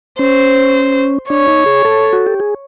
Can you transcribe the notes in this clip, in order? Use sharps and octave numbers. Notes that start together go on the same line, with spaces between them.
C#4 C5
D4 C#5
D#4
G#4
A4
F#4
G4
G#4